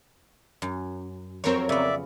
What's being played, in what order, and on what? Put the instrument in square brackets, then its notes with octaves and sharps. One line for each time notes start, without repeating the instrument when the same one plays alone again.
[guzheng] F#2
[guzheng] F2 F#3 [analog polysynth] C4 A#4 C#5
[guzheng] C#3 B3 [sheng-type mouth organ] D5 E5